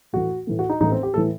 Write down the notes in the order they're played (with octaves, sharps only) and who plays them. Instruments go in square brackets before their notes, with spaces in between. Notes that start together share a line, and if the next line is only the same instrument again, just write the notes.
[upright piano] A2 E3 A3 [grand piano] F#4
[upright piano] A2 E3 A3
[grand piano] F#4
D#4
[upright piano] A1 A2 E3 [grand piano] D#4
[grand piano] C4
G4
[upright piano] A2 E3 [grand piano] A4